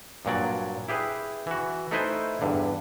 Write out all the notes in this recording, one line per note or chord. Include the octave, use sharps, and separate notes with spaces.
G2 A#2 F#3 D5
E4 G4 G#4 B4
E3 F#4
A3 D#4 E4 B4 C5 G#5
E2 G2 D3